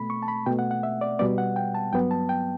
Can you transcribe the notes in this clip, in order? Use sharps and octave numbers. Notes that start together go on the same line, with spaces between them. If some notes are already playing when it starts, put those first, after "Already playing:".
Already playing: B2 A3 B5
C#6
A5
B5
B2 A3 G5
F#5
F#5
E5
D5
B2 G3 B3 D5
F#5
G5
A5
G2 F#3 B3 G5
A5
G5